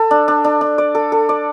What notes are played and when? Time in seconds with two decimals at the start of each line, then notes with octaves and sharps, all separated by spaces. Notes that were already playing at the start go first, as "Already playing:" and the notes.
Already playing: A4
0.11 D4
0.28 D4
0.44 D4
0.61 D4
0.78 D5
0.95 A4
1.12 A4
1.29 D5